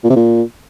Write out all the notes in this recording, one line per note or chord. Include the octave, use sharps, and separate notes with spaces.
A#2
C3
A#2